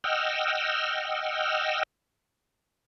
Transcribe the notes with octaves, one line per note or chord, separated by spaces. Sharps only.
D#5 F#5 G5 E6 F6